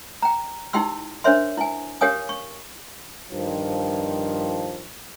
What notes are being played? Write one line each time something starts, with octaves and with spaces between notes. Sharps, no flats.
G5 A#5
D#4 E4 G4 G5 C6 E6
D4 A#4 C5 C#5 E5 C6
E4 G#5
G4 A#4 C#5 F5 G#5 D#6
C#6
G2 D#3 F3